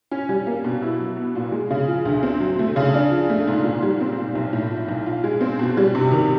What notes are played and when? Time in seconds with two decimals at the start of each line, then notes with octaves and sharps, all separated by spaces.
0.11 C#4
0.29 G3
0.47 A#3
0.64 B2
0.82 E4
1.00 F#3
1.17 B3
1.35 A#2
1.52 G#3
1.70 C#3
1.88 F3
2.05 D2
2.23 C4
2.40 F#3
2.59 A3
2.76 C#3
2.94 D4
3.11 F3
3.30 A3
3.47 G#2
3.64 A#2
3.82 G3
4.01 C4
4.18 A#2
4.35 B1
4.53 A2
4.71 F3
4.88 B1
5.06 F4
5.24 G#3
5.41 C4
5.59 B2
5.77 G3
5.95 C3
6.11 D#3